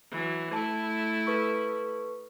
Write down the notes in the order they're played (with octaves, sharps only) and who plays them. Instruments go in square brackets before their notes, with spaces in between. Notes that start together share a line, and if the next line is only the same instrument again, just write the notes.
[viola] E3 F#3
[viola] A3 E4 [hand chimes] A5
[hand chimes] A4 B4 C#6